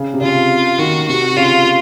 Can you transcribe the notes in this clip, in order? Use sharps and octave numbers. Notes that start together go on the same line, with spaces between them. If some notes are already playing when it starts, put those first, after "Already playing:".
Already playing: C#3
C3
C#3 F4
D#3 F#4
C3 F#4
C#3 F4